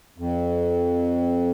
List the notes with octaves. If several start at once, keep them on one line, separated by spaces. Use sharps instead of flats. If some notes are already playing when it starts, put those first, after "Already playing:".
F2